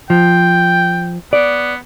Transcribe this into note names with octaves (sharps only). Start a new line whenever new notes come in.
F3 G5
B3 D5